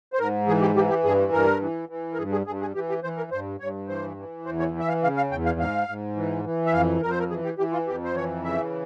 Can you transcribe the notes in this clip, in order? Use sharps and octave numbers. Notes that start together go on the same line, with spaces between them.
C5
G#2 A#4
E3 G#4
G4
E3 G4
G4
G2 G#4
G2 A#4
E3
E3
A#4
G2 G#4
G#4
G2 G#4
G#4
E3 G4
G4
E3 C5
A#4
G2 C5
G2 C#5
E3 C5
E3
E2 C5
C#5
E3
E5
F5
C#3 F5
F5
E2 G5
F5
G#2 F5
G#2
E3
E3
E5
F2 F5
F2 A#4
C5
A#4
E3 G#4
G4
E3 G4
F4
F2 G4
C5
E3 C#5
C#3 E5